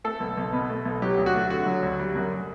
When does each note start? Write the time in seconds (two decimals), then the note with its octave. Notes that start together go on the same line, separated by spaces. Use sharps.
0.04 A3 A4
0.20 B1
0.38 B1
0.53 B2
0.70 A3
0.85 B1
1.02 F#3 G4
1.18 D2
1.26 F#4
1.34 A3
1.50 D3 F#4
1.66 F#3
1.83 D2
1.99 G3
2.15 F#2